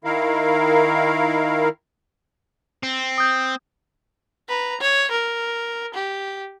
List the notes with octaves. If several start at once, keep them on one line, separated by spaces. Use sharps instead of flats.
D#3 E4 A#4 F5
C4
D#6 G6
B4 A#5
C#5
A#4
G4